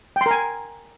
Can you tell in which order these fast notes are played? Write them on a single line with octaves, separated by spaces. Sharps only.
G5 C6 A#4 G#5